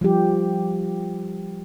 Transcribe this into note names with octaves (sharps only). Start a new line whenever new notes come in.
F3 G3 G4